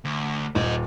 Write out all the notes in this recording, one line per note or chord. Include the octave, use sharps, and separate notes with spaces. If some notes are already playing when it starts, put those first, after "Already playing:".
D2
D#1 C5 D#5